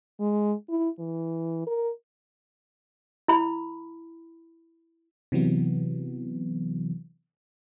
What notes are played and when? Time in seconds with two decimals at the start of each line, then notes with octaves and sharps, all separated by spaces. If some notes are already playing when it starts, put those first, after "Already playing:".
0.20 G#3
0.69 E4
0.99 E3
1.67 A#4
3.28 E4 B5
5.32 C3 E3 F#3 B3